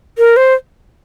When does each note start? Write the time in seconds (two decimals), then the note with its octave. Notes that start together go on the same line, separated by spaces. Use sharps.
0.18 A#4
0.37 C5